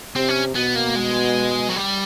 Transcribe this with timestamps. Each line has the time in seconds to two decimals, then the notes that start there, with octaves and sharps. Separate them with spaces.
0.16 C3 C4
0.29 C#4
0.56 B2 B3
0.76 A#3
0.96 G#3
1.69 F#3
1.76 G3